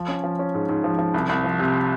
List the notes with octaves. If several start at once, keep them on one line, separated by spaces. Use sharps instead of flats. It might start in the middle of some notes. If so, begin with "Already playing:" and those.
Already playing: F3
C#4
F3
C#4
G#2
G#2
F3
F3
C2
C2
F3
C3